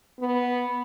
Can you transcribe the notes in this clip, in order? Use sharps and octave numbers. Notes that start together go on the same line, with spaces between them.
B3